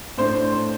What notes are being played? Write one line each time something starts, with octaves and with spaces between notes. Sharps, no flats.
A2 A3 D4 C5 C6